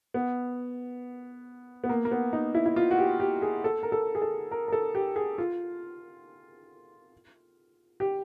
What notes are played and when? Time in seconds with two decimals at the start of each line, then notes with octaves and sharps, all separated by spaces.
0.14 B3
1.84 B3
1.89 A#3
2.05 A#3
2.11 B3
2.33 D#4
2.55 E4
2.66 E4
2.76 F4
2.91 F#4
2.98 G4
3.20 G4
3.42 G#4
3.64 A4
3.83 A#4
3.92 A4
4.15 G#4
4.22 A4
4.51 A#4
4.68 A#4
4.72 A4
4.95 G4
5.16 G#4
5.38 F4
8.00 G4